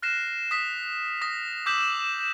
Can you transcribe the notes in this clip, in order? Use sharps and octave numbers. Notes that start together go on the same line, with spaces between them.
F6 F#6 A#6 C7 E7
D#6 B6
D#6 A#6
D6 E6 G6 B6 E7 F#7